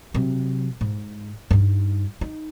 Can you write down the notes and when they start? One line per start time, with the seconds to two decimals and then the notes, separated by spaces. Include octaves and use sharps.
0.14 C3 F#3
0.81 G#2
1.51 G2 D#4
2.21 D#4